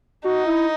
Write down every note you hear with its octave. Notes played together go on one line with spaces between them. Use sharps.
D#4 F#4
E4